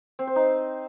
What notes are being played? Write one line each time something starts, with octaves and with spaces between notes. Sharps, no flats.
C4
C5
D#4